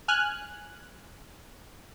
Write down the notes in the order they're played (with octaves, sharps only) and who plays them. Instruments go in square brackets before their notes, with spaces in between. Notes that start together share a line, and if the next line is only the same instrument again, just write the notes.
[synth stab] G#5 F6 F#6